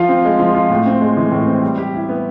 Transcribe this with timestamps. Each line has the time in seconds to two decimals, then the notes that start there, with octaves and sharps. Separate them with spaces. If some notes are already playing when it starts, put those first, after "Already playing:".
Already playing: F3 F4
0.09 C4
0.25 G#3
0.39 F3
0.55 F4
0.70 A2
0.86 C4
1.01 G#3
1.17 E3
1.31 A2
1.47 C4
1.62 G3
1.78 G4
1.94 E4
2.09 B3